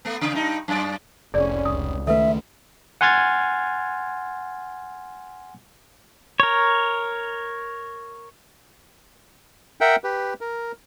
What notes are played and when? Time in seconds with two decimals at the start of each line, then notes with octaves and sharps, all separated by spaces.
0.05 A3 B3
0.21 C#3
0.33 G2 D#4
0.68 F#2 D5
1.34 F1 C2 C#4 G#4 D5
1.65 C#2 D#6
2.07 D#3 A3 A4 B4 E5
3.01 F#5 G#5 C6 F6 G#6 A6
6.40 A#4 C#5
9.81 A#4 E5 F#5 G5
10.04 G4 B4
10.41 A#4